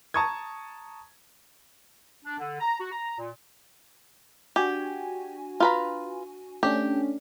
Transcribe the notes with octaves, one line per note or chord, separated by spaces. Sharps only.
A5 A#5 C#6 D#6 G#6
D4
D3
A#5
F#4
A#5
A#2
D4 F#4 G4 G#5
F4 B4 A#5
A3 C#4 D4 G4